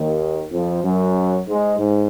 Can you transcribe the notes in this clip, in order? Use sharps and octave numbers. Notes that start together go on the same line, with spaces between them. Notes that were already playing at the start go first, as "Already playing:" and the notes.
Already playing: D#2 D#3
F2 F3
F#2 F#3
G#2 G#3
G#2